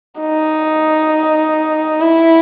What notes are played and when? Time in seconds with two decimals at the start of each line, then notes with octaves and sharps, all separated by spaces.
0.20 D#4
2.02 E4